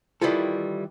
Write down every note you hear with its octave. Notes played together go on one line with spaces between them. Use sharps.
D#3 E3 G3 E4 F4 A4